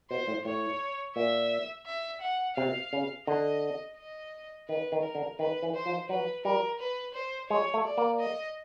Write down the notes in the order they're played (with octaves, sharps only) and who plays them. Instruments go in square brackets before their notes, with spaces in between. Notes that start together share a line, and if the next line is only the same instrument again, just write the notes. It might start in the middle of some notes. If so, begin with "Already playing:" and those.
[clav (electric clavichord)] B2 [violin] C5
[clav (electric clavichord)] A2
[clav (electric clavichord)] A2 [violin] C#5
[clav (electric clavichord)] A#2 [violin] E5
[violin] E5
F#5
[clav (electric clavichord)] C3 [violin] F5
[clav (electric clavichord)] C#3
[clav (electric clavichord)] D3 [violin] D#5
[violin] D#5
[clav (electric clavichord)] D#3 [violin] B4
[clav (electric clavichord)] D#3
[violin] A#4
[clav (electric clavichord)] D3
[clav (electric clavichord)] D#3 [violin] B4
[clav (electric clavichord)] E3
[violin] C5
[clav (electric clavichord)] F3
[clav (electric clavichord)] F#3 [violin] B4
[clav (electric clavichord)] G3 [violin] A#4
[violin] B4
C5
[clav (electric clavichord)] G#3 [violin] C#5
[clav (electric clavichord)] A3
[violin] D5
[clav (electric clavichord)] A#3
[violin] D#5